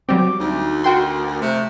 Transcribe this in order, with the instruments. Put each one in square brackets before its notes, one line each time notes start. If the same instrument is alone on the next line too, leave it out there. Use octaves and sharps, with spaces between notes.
[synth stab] F#3 G3 C4 [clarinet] D6
[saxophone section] D2 [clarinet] D#4
[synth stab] F#4 G5 C6 [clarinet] A#4
[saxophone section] F2 C3 [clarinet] A3